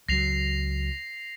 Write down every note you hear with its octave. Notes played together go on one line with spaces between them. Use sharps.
C#2 F#3 A#6 C7 F7